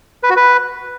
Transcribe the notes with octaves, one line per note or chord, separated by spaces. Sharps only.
B4
F#4
B4